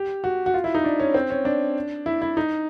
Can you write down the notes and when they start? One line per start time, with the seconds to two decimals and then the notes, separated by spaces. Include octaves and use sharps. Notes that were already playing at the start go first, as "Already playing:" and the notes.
Already playing: G4
0.24 F#4
0.46 F#4
0.54 F4
0.64 E4
0.75 D#4
0.85 D4
1.00 C#4
1.14 C4
1.30 C#4
1.45 D4
2.06 E4
2.22 E4
2.37 D#4